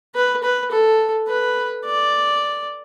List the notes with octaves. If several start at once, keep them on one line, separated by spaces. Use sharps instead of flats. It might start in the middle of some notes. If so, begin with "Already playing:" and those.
B4
B4
A4
B4
D5